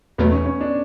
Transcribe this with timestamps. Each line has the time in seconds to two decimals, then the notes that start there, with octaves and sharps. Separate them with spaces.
0.18 E2 B2 F#3 A3 B3
0.32 C#4
0.46 C#4
0.61 D4